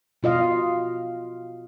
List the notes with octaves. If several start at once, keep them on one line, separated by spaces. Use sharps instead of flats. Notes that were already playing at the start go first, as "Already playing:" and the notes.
B2 F4 D#5 F5